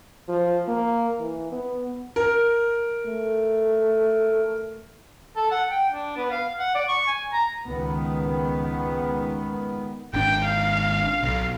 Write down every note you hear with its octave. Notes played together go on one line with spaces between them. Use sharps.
F3
A#3
E3
B3
A#4
A3
A4
F#5
G5
D4
B3
F5
F#5
D5
C#6
G#5
A#5
C#2 D#3 B3
G#1 D4 G5
F5
B1